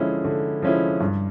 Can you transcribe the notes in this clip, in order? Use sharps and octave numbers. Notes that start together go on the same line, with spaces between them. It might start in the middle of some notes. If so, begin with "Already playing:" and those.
Already playing: D3 F3 G#3 C#4 E4
D3
F3 G#3 C#4 E4
G2